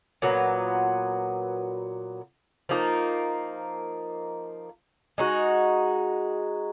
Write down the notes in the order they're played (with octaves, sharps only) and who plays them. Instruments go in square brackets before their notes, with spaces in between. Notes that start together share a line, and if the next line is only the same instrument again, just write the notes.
[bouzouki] A#2 F#3 B3
F3 A#3 D#4
G#3 D#4 F#4